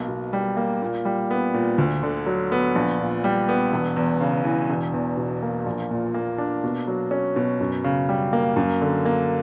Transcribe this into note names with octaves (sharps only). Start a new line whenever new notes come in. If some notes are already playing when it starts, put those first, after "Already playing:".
Already playing: B1 A#3
B2
G3
A#3
A#2
G3
B3
A#2
D2
D3
F#3
B3
A#1
A#2
G3
B3
E1
E2
C#3
E3
E1
E2
B2
A#3
A#1
A#2
A#3
D4
B2
F#3
C#4
B2
F#2
C#3
G3
A#3
F#2
D3
A#3